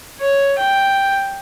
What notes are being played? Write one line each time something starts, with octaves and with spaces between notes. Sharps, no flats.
C#5
G5